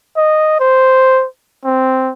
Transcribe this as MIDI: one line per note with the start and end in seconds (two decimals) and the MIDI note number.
0.16 0.57 75
0.60 1.25 72
1.65 2.12 60